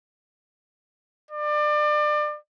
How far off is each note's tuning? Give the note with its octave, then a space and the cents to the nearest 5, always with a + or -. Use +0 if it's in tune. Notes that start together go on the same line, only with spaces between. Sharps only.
D5 +30